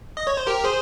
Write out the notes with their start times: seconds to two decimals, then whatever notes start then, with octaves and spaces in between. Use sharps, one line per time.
0.17 D#5
0.27 C#5
0.37 C5
0.47 G4 A#4
0.64 G#4 C5